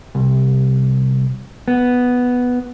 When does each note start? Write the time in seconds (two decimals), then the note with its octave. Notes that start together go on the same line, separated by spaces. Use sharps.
0.15 C2
1.68 B3